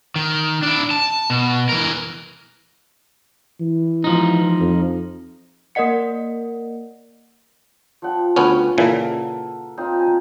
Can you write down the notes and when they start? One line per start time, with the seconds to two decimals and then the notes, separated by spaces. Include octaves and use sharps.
0.16 D#3
0.63 D4 E4
0.91 A5
1.30 B2
1.69 E3 A#4
3.60 E3
4.04 F3 D#4
4.60 F2
5.75 A#3 A#4 D5 D#5 F#5 C#7
8.02 F3 F#5 G5
8.36 D2 B3 C#4 B4 F#5
8.78 A#2 C#3 E3 A4 A#4 E6
9.77 C4 D#4 F4
9.99 G#5 A#5